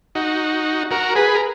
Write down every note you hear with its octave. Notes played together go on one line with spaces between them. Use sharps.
D#4 F#4
F#4 A#4
G#4 B4
A#4